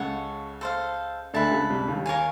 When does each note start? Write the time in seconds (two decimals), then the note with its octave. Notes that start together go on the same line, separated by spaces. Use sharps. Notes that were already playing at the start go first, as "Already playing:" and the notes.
Already playing: C#2 C#3 A4 C#5 F#5
0.61 A4 C5 F5
1.33 D2 D3 B4 E5 A5
1.52 C#2 C#3
1.70 C2 C3
1.88 D#2 D#3
2.06 A#4 C#5 F5 G#5